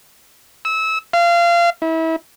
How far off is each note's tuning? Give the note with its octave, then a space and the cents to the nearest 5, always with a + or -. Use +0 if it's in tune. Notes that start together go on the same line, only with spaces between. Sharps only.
E6 -25
F5 -25
E4 -30